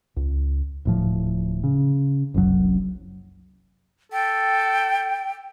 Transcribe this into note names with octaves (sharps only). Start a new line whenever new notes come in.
C#2
D1 A2 F3
C#3
F#1 C2 F#2 F#3
A4 G5